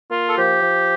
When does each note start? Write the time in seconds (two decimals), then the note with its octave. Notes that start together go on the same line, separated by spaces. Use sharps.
0.11 A#3 F4
0.29 A4
0.36 F3 G4
0.62 F3